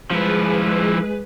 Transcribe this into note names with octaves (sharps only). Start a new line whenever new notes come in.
F3 G#3 E4 G#4 B4